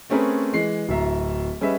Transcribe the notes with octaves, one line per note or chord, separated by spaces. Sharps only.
A3 C4 C#4 G#4 A#4 B4
E3 G#3 C7
D1 E5 A#5
G3 C#4 G#4 B4 D#5 E5